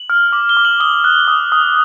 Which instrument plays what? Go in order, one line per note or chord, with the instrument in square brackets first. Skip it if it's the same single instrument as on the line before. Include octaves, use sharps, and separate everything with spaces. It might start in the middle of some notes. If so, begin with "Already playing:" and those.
Already playing: [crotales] F#7
F6
D6 F#7
G7
D6
F#7
D#6 G7
F#6
D#6
D#6